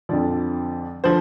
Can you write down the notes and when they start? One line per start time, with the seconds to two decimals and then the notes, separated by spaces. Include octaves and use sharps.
0.09 F2 D3 F3 D5
1.04 D3 F3 C5